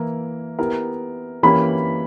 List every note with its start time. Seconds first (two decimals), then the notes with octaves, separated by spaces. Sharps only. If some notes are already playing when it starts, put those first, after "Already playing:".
Already playing: E3 A#3 E4 A#4
0.59 B3 E4 G4 A#4
1.43 E3 A#3 C#4 G4 A#4 B5